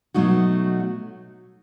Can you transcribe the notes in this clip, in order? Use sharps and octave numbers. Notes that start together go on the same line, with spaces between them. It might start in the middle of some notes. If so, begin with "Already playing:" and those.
B2 F#3 A3 D#4 F#4